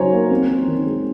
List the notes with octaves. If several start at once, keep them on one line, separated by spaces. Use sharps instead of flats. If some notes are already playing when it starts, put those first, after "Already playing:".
Already playing: C#3 F#3 D#4 C5 C#5 G#5 A#5
A#3
C4
C4
D#3
G#3